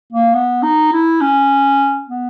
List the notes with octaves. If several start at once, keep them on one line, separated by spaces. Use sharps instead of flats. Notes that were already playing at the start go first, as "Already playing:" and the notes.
A#3
B3
D#4
E4
C#4
B3